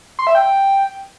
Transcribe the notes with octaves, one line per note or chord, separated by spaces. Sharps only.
C6
E5
G5